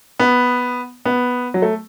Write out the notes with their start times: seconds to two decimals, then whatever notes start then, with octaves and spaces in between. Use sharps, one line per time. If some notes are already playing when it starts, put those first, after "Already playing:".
0.19 B3
1.05 B3
1.54 F#3
1.62 A3